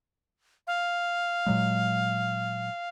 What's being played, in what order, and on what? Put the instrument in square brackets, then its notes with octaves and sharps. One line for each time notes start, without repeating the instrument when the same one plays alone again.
[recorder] F5
[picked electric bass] A#2 F#3 G#3